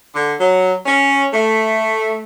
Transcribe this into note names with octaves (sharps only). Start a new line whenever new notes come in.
D3
F#3
C#4
A3